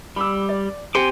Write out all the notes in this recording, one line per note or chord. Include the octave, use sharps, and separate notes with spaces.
G3 B5 D6 E6
D5
C4 G4 G#5 C6 D6 C#7